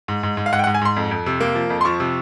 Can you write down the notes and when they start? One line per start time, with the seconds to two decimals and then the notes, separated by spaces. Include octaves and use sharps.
0.08 G#2
0.23 G#2
0.37 G#2
0.46 F5
0.52 G#2 F#5
0.59 G5
0.64 F#5
0.67 G#2
0.74 G#5
0.81 G#2 C6
0.96 F2
1.11 F2
1.26 C3
1.41 A#3
1.55 F3
1.70 F2
1.81 C6
1.85 F3 C#6
2.00 C3